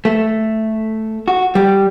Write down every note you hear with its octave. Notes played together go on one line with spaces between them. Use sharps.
A3
F#4
G3